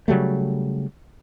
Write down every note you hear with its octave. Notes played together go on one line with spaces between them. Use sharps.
C#3 F#3 G3 A3